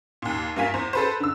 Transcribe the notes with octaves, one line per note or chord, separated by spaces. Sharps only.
D#2 A#2
G2 A#3 F4 G#5 B6
E2 C5
A4 B4 C5
D3 E6